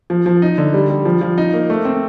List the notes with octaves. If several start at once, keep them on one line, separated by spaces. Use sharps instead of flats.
F3
F3
D#4
D3
G3
G3
F3
F3
D#4
A#3
A3
C4